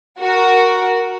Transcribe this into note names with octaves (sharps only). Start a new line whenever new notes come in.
F#4 A#4